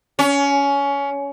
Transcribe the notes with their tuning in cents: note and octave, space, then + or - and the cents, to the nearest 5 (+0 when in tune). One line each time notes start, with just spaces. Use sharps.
C#4 +20